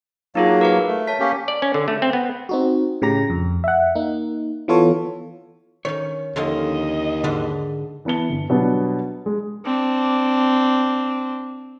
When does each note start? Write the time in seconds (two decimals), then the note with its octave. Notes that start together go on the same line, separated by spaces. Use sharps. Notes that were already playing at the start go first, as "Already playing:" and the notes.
0.35 F#3 A#3 D#4 F4 G#4
0.61 A#4 B4 F5
0.87 A3
1.07 C#5 A5 B6
1.20 A#3 C#4 G4
1.48 D5
1.62 C#4
1.74 D3
1.88 A3
2.02 C4
2.13 B3
2.49 C4 D#4 F#4
3.02 A2 C#3 G4 A#5 A#6
3.30 F2
3.64 E5 F#5
3.95 A#3 D#4
4.68 E3 B3 F4 A4 C#5
5.85 D#3 C#4 C#5
6.36 D#2 D3 F3 C#4 D#5
7.24 G#2 D3 D4 B4
8.05 E3 B3 A5 C#7 G7
8.30 G1
8.50 B2 F#3 G3 B3 D4
9.26 G#3
9.65 C4 D4